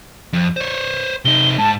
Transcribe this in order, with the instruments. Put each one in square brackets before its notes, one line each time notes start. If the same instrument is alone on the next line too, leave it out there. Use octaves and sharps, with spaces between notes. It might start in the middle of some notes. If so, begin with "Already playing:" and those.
[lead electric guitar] F2
C5 C#5
[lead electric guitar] C3 D#4 [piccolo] G7
[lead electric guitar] G#2 [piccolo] A5